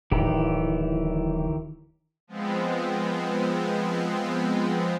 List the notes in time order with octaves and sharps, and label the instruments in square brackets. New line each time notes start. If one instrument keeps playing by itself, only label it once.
[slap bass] D1 [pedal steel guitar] D#3 E3 G4
[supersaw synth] F3 G#3 B3 C4